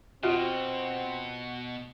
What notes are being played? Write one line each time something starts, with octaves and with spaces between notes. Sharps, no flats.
B2 C4 F4 F#4 D#5